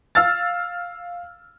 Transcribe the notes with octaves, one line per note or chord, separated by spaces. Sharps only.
F5 E6 F6 A6